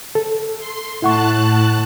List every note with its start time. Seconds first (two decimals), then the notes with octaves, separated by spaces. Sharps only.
0.15 A4
0.59 C6
1.02 A2 E4 F#5 A5 C#6 F#6